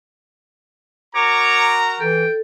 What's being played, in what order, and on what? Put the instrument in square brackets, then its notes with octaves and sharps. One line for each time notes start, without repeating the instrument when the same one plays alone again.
[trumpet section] F#4 A#4 A#5 [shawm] C#5 [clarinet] D6
[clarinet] E3 [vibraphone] A4 [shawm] G5